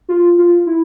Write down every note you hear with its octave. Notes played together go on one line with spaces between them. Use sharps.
F4
F4
E4